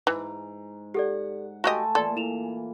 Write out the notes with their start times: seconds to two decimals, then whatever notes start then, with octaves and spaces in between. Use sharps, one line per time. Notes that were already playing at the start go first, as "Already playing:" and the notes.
0.07 G#2 E3 A#5
0.94 G4 A4 D5 F#5
1.64 A3 F#4 G4 D#5 F5 G#5 A5 C6
1.95 A#2 E3 A4 D5 C6
2.16 E4 E7 F7